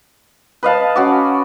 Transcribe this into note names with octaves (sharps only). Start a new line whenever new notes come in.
B4 D#5 F5 A5
C#4 F#4 D6